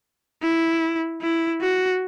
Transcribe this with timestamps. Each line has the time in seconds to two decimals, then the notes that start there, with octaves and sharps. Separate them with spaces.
0.43 E4
1.22 E4
1.61 F#4